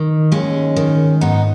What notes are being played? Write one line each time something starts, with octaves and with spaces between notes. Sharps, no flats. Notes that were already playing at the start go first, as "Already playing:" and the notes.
Already playing: D#3
D#2 G#3 C#4
D#3
G#2 B3 D#4